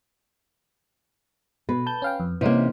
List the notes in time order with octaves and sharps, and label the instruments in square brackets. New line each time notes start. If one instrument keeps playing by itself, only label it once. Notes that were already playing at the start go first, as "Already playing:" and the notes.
[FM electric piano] B2 [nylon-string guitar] B4
[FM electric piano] A5 G6
C#4 F5 G5
F2
[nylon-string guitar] C3 A#3 [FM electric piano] E3 C#4 D#4